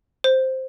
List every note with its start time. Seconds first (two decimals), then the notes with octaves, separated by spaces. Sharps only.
0.24 C5